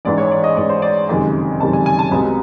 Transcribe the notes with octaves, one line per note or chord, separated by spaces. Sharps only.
A1 G#2 E3 D5
C#5
D5
D#5
A1 G#2 E3 D5
C5
D5
F#1 F2 C3 D#3 G#3
F#1 F2 C3 D#3 G#3 A5
G#5
G#5
A5
C2 B2 G#3 C4